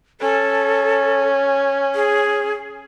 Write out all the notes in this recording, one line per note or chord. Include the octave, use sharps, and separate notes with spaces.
C#4 A4
G#4